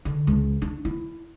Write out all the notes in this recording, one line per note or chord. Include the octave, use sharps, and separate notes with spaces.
D3
C#2
D4
E4